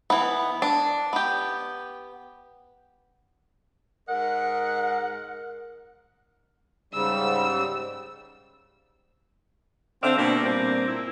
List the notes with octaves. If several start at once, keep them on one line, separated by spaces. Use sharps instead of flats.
E3 B3
D4
B3 G4
G#2 A#4 D#5 F#5
G#2 C#3 G3 E6
D3 C4 D5 E5 F5
B2 A#3 C4 D4
G2 A#2 C4
E4